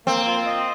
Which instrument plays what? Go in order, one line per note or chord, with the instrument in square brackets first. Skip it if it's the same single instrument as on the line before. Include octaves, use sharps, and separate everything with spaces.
[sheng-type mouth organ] A#3 [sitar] C4
[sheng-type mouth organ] F4
D#5